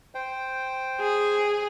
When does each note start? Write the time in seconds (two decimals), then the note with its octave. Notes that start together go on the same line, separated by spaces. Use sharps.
0.15 C5 G5
1.01 G#4